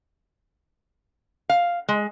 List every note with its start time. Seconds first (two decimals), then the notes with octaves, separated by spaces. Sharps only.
1.49 F5
1.88 G#3